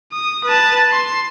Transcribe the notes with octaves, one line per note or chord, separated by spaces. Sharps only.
D#6
B4 A5
C6